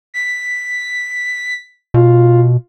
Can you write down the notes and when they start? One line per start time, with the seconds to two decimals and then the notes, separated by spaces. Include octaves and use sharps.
0.14 B6
1.94 B2 F4